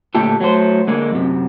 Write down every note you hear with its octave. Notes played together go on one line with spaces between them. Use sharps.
A#2 D3 A3 G4 A4
F#3 A3 C5
D3 G#3 A#3
F#2 C3